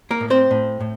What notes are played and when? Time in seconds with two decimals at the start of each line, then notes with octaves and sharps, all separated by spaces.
0.11 A#3 A#4
0.20 A2
0.30 C4 C5
0.51 A2
0.80 A2